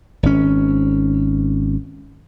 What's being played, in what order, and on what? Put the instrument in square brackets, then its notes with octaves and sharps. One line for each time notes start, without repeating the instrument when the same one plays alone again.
[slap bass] G#1 C#4